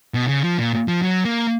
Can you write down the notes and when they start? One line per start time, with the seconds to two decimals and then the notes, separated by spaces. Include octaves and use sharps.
0.14 B2
0.28 C#3
0.44 F3
0.58 A#2
0.88 F3
1.03 F#3
1.25 A#3